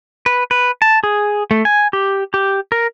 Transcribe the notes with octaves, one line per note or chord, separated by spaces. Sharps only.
B4
B4
A5
G#4
A3
G#5
G4
G4
A#4